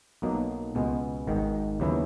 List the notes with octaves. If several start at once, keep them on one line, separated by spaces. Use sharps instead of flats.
B1 B2 F#3 A#3 D#4
C#2 B2 G#3 B3
G#1 G#2 D#3
D#2 C#3 F#3 B3 E4